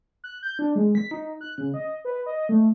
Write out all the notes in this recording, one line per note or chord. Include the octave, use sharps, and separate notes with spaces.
F#6
G6
D4
G#3
B6
D#4
F#6
C#3
D#5
B4
D#5
A3